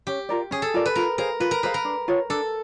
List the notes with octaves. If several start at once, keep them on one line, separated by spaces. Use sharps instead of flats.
C#4 G4
F4 A#4 D5
C#4 G#4
A4
F4 A#4 D5
B4
F4 A#4
G#4 A#4 C5 F5
F4 B4
A#4
G#4 B4 C5 F5
A#4
D4
F4 A4 C#5
D4 A4